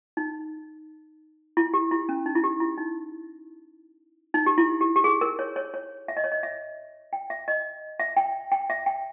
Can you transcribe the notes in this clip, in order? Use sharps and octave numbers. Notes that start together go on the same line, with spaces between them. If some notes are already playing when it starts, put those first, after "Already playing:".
D#4
E4
G4
E4
C#4
D#4
E4
G4
E4
D#4
D#4
G4
E4
G4
G4
G#4
A#4
C#5
C#5
C#5
E5
D#5
C#5
D#5
E5
G5
E5
D#5
E5
G5
G5
E5
G5